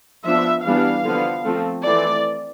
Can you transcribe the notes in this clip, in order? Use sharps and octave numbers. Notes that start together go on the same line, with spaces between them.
F3 B3 D4 E5
E3 G3 B3 D4 F5
D3 F3 B3
F3 A3 C4
E3 A3 C4 D5